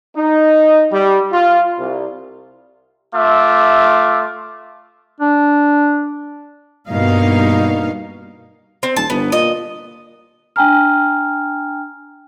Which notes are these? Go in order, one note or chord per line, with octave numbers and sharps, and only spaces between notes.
D#4
G3
F4
C2
A3 F4 E5 D6
D4
G2 B2 A#3 D#4 F5
C4
D#1 A5
G1 B3
A#2 D#5
D4 G5 G#5 A#5 F6